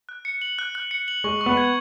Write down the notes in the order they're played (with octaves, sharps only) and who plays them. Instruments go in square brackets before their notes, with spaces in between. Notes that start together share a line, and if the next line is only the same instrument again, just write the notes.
[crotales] F#6
C#7
F#7
F#6
F#6
C#7
F#7
[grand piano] G#3 [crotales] C#6
[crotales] C#6
[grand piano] B3
[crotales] G#6